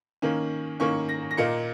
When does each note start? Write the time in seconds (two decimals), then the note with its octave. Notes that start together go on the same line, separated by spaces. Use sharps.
0.22 D#3 A#3 C#4
0.80 D#3 A#3 C#4 C#6
1.09 A#6
1.31 A#6
1.37 A#2 A#3 D#4 C#7